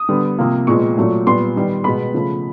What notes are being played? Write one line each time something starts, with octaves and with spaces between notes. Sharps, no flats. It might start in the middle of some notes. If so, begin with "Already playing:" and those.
Already playing: D#6
D3 G3 B3
C3 F3 A#3
A#2 F3 G#3 B3 C#6
A#2 F#3 A3
A#2 G3 B3 C6
D#3 G3 B3
B2 G#3 B3 B5
C#3 F3 A3